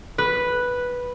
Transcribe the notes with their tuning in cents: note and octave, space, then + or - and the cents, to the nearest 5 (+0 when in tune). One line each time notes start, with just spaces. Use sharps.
B4 -5